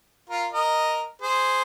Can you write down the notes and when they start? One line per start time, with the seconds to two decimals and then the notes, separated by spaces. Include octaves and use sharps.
0.30 F4 A#4
0.53 A#4 D#5
1.22 G#4 C5